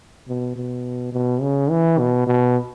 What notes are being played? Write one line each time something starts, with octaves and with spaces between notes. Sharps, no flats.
B2
B2
B2
C#3
E3
B2
B2